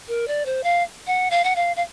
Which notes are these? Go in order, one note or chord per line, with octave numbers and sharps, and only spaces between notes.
A#4
D5
C5
F5
F#5
F5
F#5
F5
F5